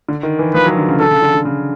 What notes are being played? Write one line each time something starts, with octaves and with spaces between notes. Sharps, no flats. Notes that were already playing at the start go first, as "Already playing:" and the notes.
D3
D#3
E3
F3 B4
F#3
D3
C#3
D3 A4
C#3
D3
D3
C#3